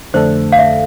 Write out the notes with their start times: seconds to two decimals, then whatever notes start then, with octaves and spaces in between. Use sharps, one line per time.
0.14 F2 D3 A3 D4 A4 C5
0.52 F5
0.59 E5